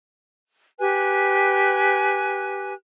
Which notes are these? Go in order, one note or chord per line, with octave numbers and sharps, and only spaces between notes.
G4 B4 G#5 F#6